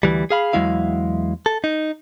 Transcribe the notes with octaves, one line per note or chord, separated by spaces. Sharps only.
D2 E3 G3
G#4 F5 B5
E2 F#3 G#3 E4 F5
A4
D#4